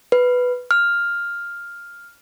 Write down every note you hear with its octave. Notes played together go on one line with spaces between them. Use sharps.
B4
F6